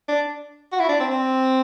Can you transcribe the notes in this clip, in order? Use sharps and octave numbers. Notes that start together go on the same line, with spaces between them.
D4
F#4
E4
D4
C4
C4